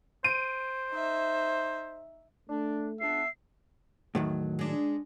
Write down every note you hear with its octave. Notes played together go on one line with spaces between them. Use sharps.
C5 D7 D#7
D#4 E5
A3 D4
C#2 B3 D4 E5 C7
E2 A2 D#3 F#3
G#3 D4